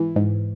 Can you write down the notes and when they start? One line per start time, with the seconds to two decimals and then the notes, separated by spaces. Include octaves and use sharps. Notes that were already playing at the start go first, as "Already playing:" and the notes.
Already playing: G#2 E3
0.16 G#2